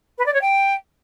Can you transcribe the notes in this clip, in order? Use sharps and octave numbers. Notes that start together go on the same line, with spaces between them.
B4
D5
C#5
G5